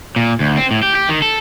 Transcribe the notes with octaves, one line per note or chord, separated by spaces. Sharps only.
A#2
D2
C4
A2
G4
G4
D#3
A4